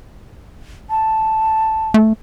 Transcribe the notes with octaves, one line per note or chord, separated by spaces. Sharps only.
A5
A3